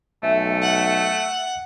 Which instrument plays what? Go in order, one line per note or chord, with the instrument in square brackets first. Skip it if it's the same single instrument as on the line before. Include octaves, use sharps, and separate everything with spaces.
[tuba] B1 [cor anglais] A3 [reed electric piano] E5 G#5
[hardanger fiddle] F#5